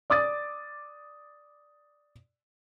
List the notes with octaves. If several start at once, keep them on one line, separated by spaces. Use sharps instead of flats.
D5 D6 D#6 A6